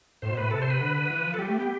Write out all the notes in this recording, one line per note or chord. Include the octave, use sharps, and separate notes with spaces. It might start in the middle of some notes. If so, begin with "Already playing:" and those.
A2 C5
B2
A2 B4
C3 A4
C5
B4
D3
E3
F3
A4
G3 G4
A3
B3